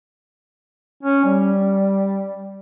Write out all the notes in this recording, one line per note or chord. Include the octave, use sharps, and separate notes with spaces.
C#4
G3